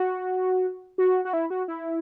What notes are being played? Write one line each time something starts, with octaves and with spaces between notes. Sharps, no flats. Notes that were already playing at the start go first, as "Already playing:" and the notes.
Already playing: F#4
F#4
F#4
E4
F#4
E4